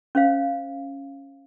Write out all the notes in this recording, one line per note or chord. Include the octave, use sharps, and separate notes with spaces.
C#4 C5 F5